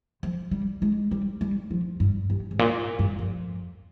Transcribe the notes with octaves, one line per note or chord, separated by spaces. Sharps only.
F3
G3
G#3
G3
G3
F3
G2
G2
G#2
A#2
G2
F2